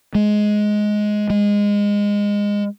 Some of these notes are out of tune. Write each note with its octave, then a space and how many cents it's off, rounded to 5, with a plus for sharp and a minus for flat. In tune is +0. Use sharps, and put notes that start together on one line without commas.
G#3 +10
G#3 -20